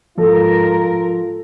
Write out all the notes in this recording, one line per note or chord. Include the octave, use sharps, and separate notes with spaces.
G#2 F3 F4 A4 A#4